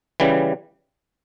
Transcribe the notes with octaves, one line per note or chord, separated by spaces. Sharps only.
C#3 E3 G3